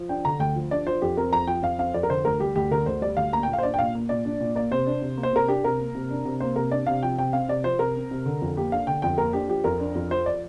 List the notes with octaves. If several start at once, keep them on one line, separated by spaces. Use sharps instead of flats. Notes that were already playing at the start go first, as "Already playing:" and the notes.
Already playing: F3
D4 G5
D3 A#5
D2 G5
F3
D4 D5
F3 C5
F2 G4
C4 A#4
F2 A#5
F3 G5
F2 F5
C4 F5
F2 D5
A#4
D3 C5
D2 A#4
G3 G4
D2 G4
D3 A#4
D2 C5
G3 D5
D2 F5
A#3 A#5
G5
A#2
F5
C5
D4 D5
G5
A#2 F5
A#3
A#2 D5
D4
A#2
A#3 D5
C3 C5
D4
C3
A#3
C5
C3 A#4
D4 G4
C3 A#4
A#3
C3
D4
C3
A#3 C5
C3 A#4
D4 D5
C3 F5
F3 G5
C3 G5
C4 F5
C3 D5
F3 C5
C3 A#4
C4
C3
D3
F2
A#3 G4
D4 F5
D3 G5
F2 G5
A#3 A#4
D4 G4
F3 G4
F2 A#4
D4
F2
F3 C5
D5